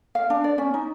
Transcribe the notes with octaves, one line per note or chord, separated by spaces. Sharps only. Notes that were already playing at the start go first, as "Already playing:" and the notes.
F5
D4
D5
C#4
D#4